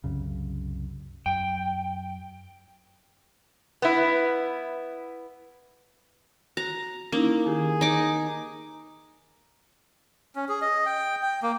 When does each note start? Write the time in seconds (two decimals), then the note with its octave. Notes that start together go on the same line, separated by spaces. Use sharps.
0.04 C2 F#2 C#3
1.26 F#2 G5
3.82 B3 E4
6.57 F#4 A#5
7.12 A#3 C#4 D#4 E4
7.46 D#3 G4 G#4
7.81 D#4 D6
10.36 C#4
10.49 G#4
10.62 D#5
10.86 G5
11.23 G5
11.43 A#3